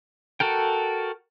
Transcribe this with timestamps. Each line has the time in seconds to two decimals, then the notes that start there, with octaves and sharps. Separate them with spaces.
0.40 F#4 A4 A#4 G5